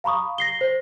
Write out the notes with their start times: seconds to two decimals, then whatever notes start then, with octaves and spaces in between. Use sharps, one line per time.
0.04 F5 A#5 B5 C#6 D#6
0.38 A#6 C7 G7
0.61 C5